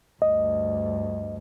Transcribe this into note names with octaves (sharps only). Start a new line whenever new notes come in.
D2 G2 D#5